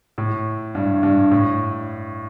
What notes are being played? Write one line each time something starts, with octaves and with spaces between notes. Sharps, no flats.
A2
G2
G2
A2